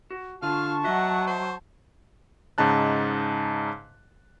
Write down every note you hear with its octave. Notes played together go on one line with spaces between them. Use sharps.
F#4
D3 F4 F5 A5 C#6
F#3 D#5 E5 F#5
C5
G#2 C#3 D#4 A5 F#6